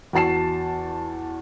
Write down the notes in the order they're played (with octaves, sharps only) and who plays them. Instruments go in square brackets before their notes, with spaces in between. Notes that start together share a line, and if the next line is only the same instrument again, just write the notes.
[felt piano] E2 F#4 A5 C7 E7